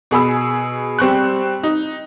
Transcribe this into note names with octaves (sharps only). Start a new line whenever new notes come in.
B2 G#4 B5 E6
G3 C4 C#6 F#6
D#4